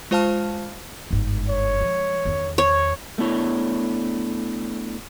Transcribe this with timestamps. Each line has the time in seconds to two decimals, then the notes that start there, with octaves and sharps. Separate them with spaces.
0.11 G#3 F4 C5 F5 A5 F6
1.11 G1 G#2
1.49 C#5
1.81 F3 G#3
2.25 E2 D#3
2.58 C#5
3.18 A3 B3 D4 E4 C#5